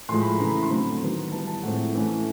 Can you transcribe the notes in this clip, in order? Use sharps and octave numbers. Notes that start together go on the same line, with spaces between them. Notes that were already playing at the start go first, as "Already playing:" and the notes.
A2 F3 G#3 C6
B5
A#5
C#3 E3 A3
B5
C6
D3 F#3 A3 C4 B5
D#3 F#3 B3
E3 G3 B3 A5
A5
A2 F3 G#3 C4 F#5
E3 A3 C#4